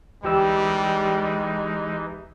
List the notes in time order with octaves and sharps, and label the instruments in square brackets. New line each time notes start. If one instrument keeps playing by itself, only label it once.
[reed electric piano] D2 G4 E6 [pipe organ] E3 D#4 [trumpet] G3 [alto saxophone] G#3